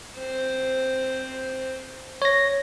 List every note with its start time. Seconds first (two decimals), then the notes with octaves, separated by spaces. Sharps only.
0.17 C4 C5
2.22 C#5 A#6